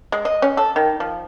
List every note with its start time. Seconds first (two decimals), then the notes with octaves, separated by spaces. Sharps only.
0.12 G#3
0.25 D#5
0.42 C#4
0.57 A4
0.76 D#3
1.00 F3